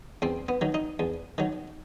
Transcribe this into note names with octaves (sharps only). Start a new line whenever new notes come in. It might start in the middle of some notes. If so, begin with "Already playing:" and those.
E2 C4
B3
D#3 F#3
D#4
E2
D#3 F#3